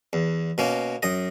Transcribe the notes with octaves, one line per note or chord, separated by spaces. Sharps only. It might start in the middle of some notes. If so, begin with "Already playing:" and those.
E2
B2 A#3 C#4
F#2 D#5